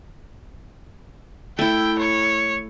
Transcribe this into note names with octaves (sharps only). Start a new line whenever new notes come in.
A3 E4 G5
C#5